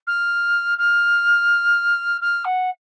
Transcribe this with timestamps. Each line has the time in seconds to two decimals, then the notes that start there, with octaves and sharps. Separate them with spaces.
0.07 F6
0.78 F6
2.21 F6
2.45 F#5